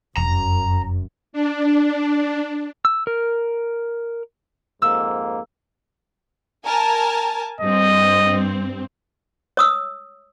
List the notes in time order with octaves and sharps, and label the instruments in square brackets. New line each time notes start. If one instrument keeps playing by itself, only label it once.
[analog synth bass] F1 [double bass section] F#2 [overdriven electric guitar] A#5
[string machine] D4
[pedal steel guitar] E6
A#4
[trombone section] F2 G#2 A#3 [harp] E6
[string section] A#4 G#5 A5
[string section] G2 C4 [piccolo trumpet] D#5
[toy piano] C#5 D#6 E6